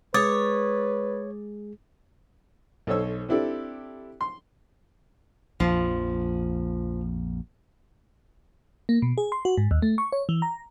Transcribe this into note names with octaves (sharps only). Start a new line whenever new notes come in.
G#3 G#4 B4 C#5 D6 D#6 A6
B1 A4 C5 C#5 E6
C4 D4 E4 G4 A4 D5
C6
A#1 F2 F3
A#3
B2
G#4
C6
F#4
G#2
D#2
A3
C#6
C#5
E3
A#5